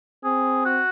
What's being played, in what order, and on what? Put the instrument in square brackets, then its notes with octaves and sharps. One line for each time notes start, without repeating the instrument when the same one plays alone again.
[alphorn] C4 [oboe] G#4
[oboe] F#4